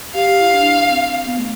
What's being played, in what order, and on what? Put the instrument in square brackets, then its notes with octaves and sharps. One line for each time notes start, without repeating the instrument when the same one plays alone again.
[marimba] G4 [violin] F5
[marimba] G4
E4
D4
C4
B3
A3